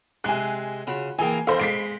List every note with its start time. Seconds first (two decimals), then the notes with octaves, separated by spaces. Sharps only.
0.24 C3 G#3 G#5 F#6
0.87 C#3 F4 F#4 B5
1.19 E3 A#3 E4 G#4 G5 G#5
1.47 E2 A4 C5 D#5 F5 B5
1.60 G#3 B6 C7 D7